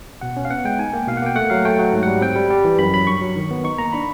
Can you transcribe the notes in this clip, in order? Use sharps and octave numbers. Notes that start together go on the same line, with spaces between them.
B2 F#5
C#4
F5
B3 F#5
G#3 G5
D#4 G#5
A#3 G5
B2 F5
F#5
A#3 G5
A3 F#5
F#3 F5
A3 G5
F#3 F#5
G#2
F#5
G3
C4 G5
G3
G3
E3
F#2 B5
F#3 B5
G2 C#6
F#3
D#3
B3
D#4 C#6
A#3 A#5
D4 B5